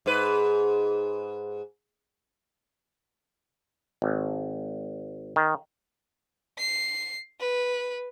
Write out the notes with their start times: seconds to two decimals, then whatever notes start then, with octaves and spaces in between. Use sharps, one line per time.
0.06 G#2 B4
4.02 G#1
5.36 D#3
6.58 C7
7.40 B4